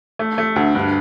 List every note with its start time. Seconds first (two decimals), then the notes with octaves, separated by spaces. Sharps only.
0.19 A3
0.38 A3
0.56 D2
0.75 G2